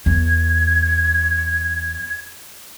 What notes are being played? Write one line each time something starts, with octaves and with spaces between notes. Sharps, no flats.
E2 G#6